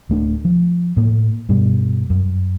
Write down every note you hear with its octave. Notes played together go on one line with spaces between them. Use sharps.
D1 A3 D4
F3
A2 A#3
G2 B2 G3
F#2